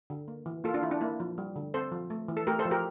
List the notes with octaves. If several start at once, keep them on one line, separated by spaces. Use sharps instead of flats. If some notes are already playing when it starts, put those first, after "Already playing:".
D3
A#3
E3
A#3 F4 A4
D4 F4
E3 E4
D4
A#3 E4
F3
G3
D3
C4 A4 C5
F3
A3
E3
A4
A3 G4 A#4
A4 C5
F3
G4 A#4